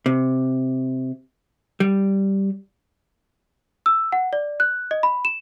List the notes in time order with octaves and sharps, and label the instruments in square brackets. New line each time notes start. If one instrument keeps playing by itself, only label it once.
[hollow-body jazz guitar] C3
G3
[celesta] E6
F#5
D5
F#6
D#5
B5
E7